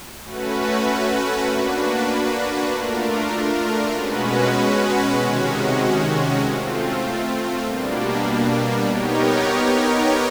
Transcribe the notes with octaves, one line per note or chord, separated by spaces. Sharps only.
A3 C#4 F#4 B4
A#3 D4 F#4 B4
A3 D4 F4 A#4
B2 G#3 C#4 F#4 B4
C3 D#3 G#3 C#4 F#4
A3 C4 F4
B2 G3 A#3 D4
B3 D#4 G4 A#4 C#5